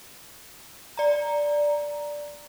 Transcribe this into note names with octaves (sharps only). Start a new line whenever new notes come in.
D5 A#5